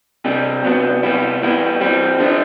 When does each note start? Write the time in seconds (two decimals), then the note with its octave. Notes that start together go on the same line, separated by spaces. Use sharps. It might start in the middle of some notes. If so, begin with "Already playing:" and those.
0.25 C3 G3 D4
0.64 C3 F#3 B3 D4
1.03 C3 G3 B3 E4
1.42 E3 G3 B3 E4
1.81 E3 G3 C4
2.19 D3 G3 D4